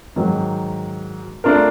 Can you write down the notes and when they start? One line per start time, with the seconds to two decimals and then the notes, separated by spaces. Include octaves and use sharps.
0.16 G#2 D#3 F#3
1.44 A3 D4 F4 A#4